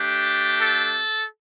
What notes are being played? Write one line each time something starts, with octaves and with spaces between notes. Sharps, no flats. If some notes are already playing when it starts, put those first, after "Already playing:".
Already playing: A3 D4 G4
A4